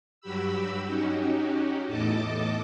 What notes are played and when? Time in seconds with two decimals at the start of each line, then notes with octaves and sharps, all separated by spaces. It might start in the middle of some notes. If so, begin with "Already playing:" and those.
0.21 G2 F#3 F#4 G4 B5 E6
0.85 C#4 D#4 F#4 G4
1.87 E2 A2 A4 D#5 A5 D6